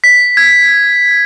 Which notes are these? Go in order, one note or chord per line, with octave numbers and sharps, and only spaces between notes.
B6
G#6